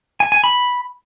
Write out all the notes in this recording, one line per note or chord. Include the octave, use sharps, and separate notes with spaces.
G#5
G#5
B5